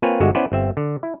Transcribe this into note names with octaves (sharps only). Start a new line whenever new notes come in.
A#3 C4 F4 B4 C#5 G#5
G1 D3 G#3 F#4 E5
B3 C#4 E4 B4 C5 D5
G1 C4 E5
D3
E4